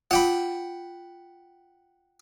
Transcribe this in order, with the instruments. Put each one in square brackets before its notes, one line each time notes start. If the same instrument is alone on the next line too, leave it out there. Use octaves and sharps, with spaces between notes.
[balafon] F4 D6 [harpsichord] F#5 G5 B5